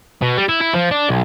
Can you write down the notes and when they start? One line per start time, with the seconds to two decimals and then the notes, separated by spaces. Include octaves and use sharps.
0.22 B2
0.38 G3
0.49 E4
0.61 E4
0.74 F3
0.91 D4
1.09 B1